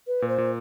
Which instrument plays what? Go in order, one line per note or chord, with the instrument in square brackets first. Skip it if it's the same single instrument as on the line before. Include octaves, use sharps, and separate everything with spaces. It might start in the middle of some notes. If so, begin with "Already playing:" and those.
[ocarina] B4
[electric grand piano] A#2
[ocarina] C5
[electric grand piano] A#2